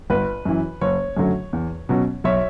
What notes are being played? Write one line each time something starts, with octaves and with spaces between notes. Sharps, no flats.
G1 B4
F#2 E3
F#1 C#5
F#2 D3 F#3 A3
E2
B2 F#3 C#4
B1 C#5 E5